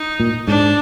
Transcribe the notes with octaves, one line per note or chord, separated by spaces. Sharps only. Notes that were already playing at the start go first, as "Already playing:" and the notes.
Already playing: D#4
A#2
G#2 D4